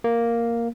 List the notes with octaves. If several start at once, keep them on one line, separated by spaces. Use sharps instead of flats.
A#3